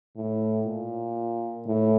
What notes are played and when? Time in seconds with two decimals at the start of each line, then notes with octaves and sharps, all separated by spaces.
0.16 A2
0.67 A#2
1.66 A2